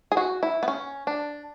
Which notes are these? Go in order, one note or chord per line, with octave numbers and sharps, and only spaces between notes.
G#4
F#4
E4
B3
C#4
D4